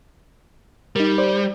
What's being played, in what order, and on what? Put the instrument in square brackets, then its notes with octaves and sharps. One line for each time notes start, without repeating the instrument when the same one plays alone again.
[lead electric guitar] G3 [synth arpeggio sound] D#4 A#4
[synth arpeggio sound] C5 D5